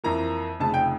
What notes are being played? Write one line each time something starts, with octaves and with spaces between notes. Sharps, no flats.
F2 E3 A#3 A#5
F1 F2 C#3 A5
G5